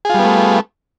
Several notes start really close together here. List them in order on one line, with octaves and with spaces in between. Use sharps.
G#4 F4 G3 B3 A3